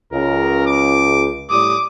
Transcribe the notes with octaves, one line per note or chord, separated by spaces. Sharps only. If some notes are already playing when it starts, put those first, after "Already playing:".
C#2 A#4
D6
A2 G3 D6 D#6